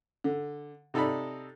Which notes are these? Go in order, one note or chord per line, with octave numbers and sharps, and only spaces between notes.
D3
C3 D#4 A4 D5 B5